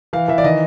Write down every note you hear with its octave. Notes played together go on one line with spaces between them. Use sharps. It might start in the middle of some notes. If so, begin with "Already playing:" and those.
E3 F5
E3 E5
D5
D#3 D#5